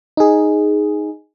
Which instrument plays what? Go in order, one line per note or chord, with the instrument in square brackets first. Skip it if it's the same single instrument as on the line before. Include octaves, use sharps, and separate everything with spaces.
[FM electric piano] D#4 G#4